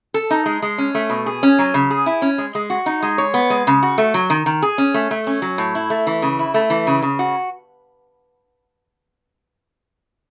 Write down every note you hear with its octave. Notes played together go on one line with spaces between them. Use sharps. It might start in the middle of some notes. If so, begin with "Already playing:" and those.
A4
D#4
G#3
G#3
C#4
A3
B2
G#4
C#4
F#3
C#3
G#4
E4
C#4
G#3
G#3
F#4
D#4
G#3
C#5
B3
G#3
C#3
F#4
A3
F#3
D#3
D#3
G#4
C#4
A3
A3
C#4
F#3
A2
E4
A3
E3
C#3
E4
A3
E3
C#3
C#3
F#4